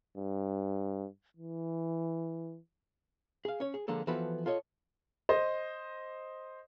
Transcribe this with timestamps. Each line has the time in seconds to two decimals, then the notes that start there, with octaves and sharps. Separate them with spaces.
0.17 G2
1.37 E3
3.45 G#4 F5
3.60 C#4 C#5
3.74 G#4
3.88 D3 F3 G#3 A#3 A4
4.07 E3 F3 B3 F#4 A4 B4
4.46 F4 A4 C#5 D#5
5.29 C5 D#5